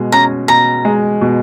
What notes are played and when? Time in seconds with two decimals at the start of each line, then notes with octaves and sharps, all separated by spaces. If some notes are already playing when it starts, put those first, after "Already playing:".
Already playing: B2 G#3
0.12 C#4 A#5
0.48 B2 A#5
0.85 G#3
1.21 B2